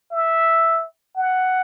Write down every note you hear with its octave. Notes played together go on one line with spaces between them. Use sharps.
E5
F#5